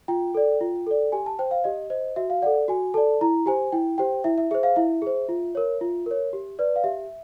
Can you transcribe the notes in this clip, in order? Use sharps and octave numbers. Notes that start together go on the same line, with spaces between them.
F4 G5
A4 D5
F4
A4 D5
G4 G#5
A5
C5 G5
F5
G4 D#5
C5 D#5
F#4 E5
F5
A4 D5 F#5
F#4 G#5
A4 D5 A5
E4 A#5
G4 C5 G#5
E4 G5
G4 C5 G5
E4 E5
E5
G#4 C5 E5
F5
E4 E5
G#4 C5
F4
A#4 C#5
F4
A#4 C#5
G4
B4 D5
F5
G4 E5